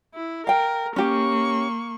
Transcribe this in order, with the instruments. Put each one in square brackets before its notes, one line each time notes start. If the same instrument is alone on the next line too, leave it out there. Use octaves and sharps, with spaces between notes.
[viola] E4
[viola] A#4 [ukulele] F5 G5
[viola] A#3 C#6 [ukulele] C#4 G4